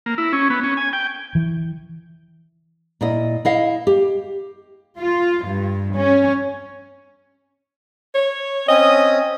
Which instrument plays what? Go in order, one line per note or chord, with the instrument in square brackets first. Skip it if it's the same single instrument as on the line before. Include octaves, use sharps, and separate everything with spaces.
[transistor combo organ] A#3
E4
C#4
B3
C#4
G#5
G5
[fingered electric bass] E3
[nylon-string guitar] A#2 E4 D#5
E4 D#5 F5
G4
[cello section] F4
G2
C#4
[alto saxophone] C#5
[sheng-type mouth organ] C4 C#4 D#6 [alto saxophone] D#5